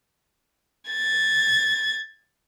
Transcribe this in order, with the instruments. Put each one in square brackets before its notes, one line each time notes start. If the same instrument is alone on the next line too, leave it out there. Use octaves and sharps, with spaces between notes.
[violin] G#6 A6